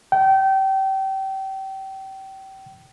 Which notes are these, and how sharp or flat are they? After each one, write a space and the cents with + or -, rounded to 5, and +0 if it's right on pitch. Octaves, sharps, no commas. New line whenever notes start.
G5 -30